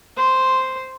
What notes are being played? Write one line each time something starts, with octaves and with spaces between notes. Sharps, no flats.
C5 C6